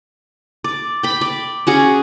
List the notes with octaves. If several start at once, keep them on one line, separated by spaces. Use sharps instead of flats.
D5
G5 B5
D5
C#4 F#4 G#4